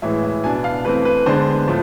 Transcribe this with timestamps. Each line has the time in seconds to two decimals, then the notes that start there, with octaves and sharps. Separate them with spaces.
0.02 A2 E3 G#3 E5
0.24 E5
0.44 B2 B3 D4 G#5
0.64 F5
0.85 E3 A3 C4 B4
1.05 B4
1.26 D3 G#3 B3 D4 C5
1.68 A2 F3 A3